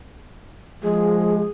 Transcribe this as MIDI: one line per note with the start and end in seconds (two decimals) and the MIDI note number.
0.84 1.44 53
0.84 1.44 56
0.84 1.49 68